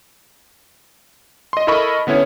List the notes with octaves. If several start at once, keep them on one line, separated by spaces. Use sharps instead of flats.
D#5 C6
E4 A4 A#4 D#5 B5 C#6
D3 B3 C#4 E4 C#5